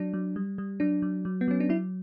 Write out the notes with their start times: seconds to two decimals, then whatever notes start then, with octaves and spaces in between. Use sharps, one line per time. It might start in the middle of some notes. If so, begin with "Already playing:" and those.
Already playing: F#3 D4
0.13 F#3
0.36 G3
0.58 G3
0.80 F#3 D4
1.02 F#3
1.25 F#3
1.41 B3
1.48 F#3 C#4
1.60 D4
1.69 F#3 E4